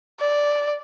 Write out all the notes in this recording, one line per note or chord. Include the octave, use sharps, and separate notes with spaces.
D5